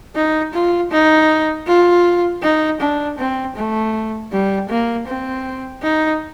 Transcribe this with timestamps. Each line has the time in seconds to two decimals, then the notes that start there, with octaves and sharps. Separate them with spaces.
0.16 D#4
0.54 F4
0.91 D#4
1.67 F4
2.43 D#4
2.81 D4
3.18 C4
3.56 A3
4.32 G3
4.69 A#3
5.07 C4
5.83 D#4